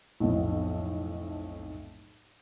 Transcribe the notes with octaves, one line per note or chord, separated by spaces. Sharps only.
B1 F2 A2